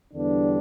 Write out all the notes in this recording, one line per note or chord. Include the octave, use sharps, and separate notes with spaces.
E2 D3 G3 B3 D4